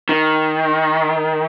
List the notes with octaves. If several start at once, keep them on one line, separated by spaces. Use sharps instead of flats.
D#3